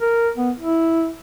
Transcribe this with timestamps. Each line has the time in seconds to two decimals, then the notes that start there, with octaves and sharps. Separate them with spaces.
0.01 A#4
0.37 B3
0.59 E4